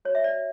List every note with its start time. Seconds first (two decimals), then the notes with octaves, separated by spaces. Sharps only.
0.05 F#4 C#5
0.15 E5
0.24 D5
0.34 C#5